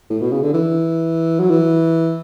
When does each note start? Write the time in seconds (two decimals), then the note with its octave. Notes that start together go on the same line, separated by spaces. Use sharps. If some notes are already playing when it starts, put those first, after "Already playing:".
0.10 A2
0.21 B2
0.32 C#3
0.42 D3
0.54 E3
1.39 F#3
1.50 E3